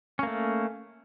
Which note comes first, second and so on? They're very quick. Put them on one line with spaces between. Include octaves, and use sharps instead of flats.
C#4 A#3 A3